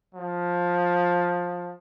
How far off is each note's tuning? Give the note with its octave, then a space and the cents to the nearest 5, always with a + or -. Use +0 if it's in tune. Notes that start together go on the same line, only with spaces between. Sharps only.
F3 +15